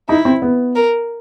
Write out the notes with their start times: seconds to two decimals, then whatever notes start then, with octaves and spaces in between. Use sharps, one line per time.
0.09 D#4 E4
0.25 C4
0.42 B3
0.75 A#4